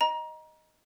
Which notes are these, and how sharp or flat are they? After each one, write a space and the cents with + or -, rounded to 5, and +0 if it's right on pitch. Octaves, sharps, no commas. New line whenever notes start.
D#5 +0 A#5 +25